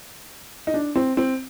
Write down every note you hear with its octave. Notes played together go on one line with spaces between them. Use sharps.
D#4
D4
C4
C4